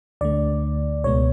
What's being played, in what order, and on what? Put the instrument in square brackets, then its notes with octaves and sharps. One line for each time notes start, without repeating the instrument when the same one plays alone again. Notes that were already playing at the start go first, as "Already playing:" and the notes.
[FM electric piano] D2 D3 A3 D5
C#2 B2 G#3 B3 C#5